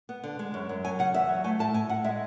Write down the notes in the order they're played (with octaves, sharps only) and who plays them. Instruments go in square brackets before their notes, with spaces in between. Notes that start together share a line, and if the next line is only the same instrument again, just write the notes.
[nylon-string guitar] B3
D3
G#3
F#2
F#2
F#3 G#5
C#3 F#5
E2 E5
F#3
A3 G#5
A2 A5
A2 G#5
A2 F#5
G#3 E5